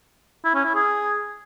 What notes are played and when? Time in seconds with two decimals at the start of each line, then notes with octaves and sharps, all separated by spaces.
0.45 E4
0.55 C#4
0.65 E4
0.75 G#4